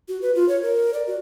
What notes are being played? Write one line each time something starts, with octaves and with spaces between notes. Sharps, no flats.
F#4
B4
F4
C#5
A#4
D5
F#4